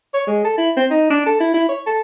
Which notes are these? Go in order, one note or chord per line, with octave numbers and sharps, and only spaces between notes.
C#5
G#3
A4
E4
C4
D#4
D4
A4
E4
E4
C#5
A4